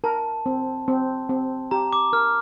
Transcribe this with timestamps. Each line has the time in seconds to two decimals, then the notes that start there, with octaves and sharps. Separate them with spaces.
0.04 A#4 A5
0.46 C4
0.88 C4
1.29 C4
1.71 G4 A#5
1.93 D6
2.13 A#4 F6